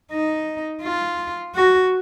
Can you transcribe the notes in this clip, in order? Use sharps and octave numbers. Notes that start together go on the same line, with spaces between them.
D#4
F4
F#4